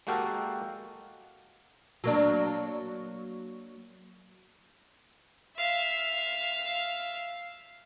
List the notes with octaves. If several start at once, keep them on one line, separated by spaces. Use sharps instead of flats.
G#3 A#3 F#4 G4 A4 A#4
F#3 A#3 D4
E5 F5